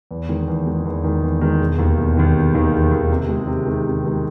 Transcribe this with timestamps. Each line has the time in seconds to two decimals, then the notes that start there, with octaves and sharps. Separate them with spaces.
0.11 E2
0.29 D#3 G#3
0.48 E2
0.67 D#3 G#3
0.85 E2
1.04 D#3 G#3
1.23 E2
1.41 D#3 G#3
1.60 E1
1.79 D#2 D#3
1.98 E1
2.17 D#2 D#3
2.35 E1
2.54 D#2 D#3
2.72 E1
2.91 D#2 D#3
3.10 C3
3.29 D#3 G#3
3.47 C3
3.66 D#3 G#3
3.85 C3
4.03 D#3 G#3